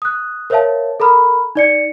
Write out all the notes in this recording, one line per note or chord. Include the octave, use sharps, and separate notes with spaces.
D#6 F#6
A#4 C5 C#5 E5 F5 A5
A4 A#4 A#5 B5 F6
D#4 D5 C#7